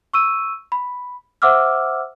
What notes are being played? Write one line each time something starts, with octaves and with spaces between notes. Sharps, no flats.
C#6 E6 D#7
B5
C5 E5 F#5 D6 E6 F6